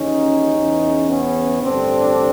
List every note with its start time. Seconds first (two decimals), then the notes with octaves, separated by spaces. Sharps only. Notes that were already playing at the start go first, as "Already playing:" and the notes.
Already playing: D#2 C#3 E3 C#4 D#4
0.58 E2 C#3 E3
1.09 B3 C#4
1.62 A1 G2 D3 C4 D4